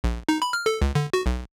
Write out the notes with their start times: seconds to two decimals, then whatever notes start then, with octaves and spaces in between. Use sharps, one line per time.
0.04 A#1
0.29 D#4
0.42 B5
0.53 F6
0.66 A4
0.82 C#2
0.95 D3
1.13 F#4
1.26 B1